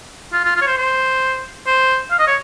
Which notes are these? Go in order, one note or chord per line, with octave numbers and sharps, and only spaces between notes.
F4
F4
F4
C#5
C5
C5
C5
F5
D#5
C#5